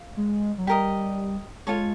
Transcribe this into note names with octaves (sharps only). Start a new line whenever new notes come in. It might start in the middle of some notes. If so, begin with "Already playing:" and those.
Already playing: F5
G#3
F#3
G3 G4 A#4 D#5
G#3 F4 A4 C#5